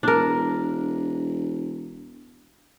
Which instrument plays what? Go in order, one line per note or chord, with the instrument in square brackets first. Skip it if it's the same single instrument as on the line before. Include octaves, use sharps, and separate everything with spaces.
[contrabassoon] E1 [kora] D4 A#4